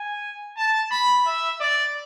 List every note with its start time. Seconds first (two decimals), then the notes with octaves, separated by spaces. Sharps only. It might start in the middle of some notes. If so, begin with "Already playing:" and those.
Already playing: G#5
0.57 A5
0.91 B5
1.26 E5
1.60 D5